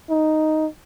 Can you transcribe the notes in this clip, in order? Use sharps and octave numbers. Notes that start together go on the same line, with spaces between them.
D#4